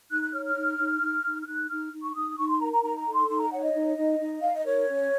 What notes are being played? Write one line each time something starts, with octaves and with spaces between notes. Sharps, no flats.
D#4 F#6
F#6
C#5 F6
F6
D#4
D#4
D#4
D#4
F6
D#4 F#6
D#4 F6
D#4
C#6
D#4 D#6
D#4 C#6
C6
A#4 A#5
A#5
D#4 A#5
A#5
A4
C6
D#4 C6
A#5
C#5 F#5
D#5
D#4
D#4
D#4
D#4 F5
D#5
A#4 C#5
C#4